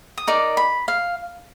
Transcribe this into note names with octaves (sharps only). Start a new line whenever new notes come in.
D#6
D#4 A#4 D5 D6
B5
F5